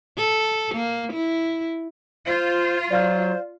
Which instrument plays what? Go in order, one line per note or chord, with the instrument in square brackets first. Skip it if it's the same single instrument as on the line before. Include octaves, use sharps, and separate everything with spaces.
[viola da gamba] A4
A#3
E4
[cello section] F4 [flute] C5
[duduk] F#3 [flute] C5 [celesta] D5 F5 F6